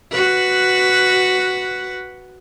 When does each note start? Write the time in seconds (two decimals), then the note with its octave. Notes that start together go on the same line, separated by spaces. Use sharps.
0.12 F#4 B4